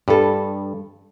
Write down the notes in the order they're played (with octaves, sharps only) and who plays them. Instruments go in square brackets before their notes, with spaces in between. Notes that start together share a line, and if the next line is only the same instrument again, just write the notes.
[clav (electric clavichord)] G2 [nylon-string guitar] G3 A4